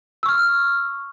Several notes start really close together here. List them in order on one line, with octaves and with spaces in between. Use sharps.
E6 C#6 F6